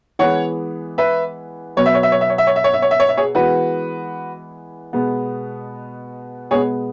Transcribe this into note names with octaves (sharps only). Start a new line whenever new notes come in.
E3 G#3 B3 C#5 F#5
B4 E5
B2 F#3 B3 C#5
E5
C#5
E5
C#5
E5
C#5
E5
C#5
E5
C#5
E5
C#5
E5
C#5
E5
G#4 C#5
E3 G#3 B3 F#4 B4
B2 G#3 B3
B2 G#3 B3 G#4 C#5